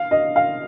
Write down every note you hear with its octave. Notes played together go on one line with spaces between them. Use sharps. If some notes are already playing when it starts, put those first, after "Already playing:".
Already playing: F5
D#5
F5